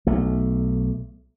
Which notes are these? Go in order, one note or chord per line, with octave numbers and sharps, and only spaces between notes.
B1 A3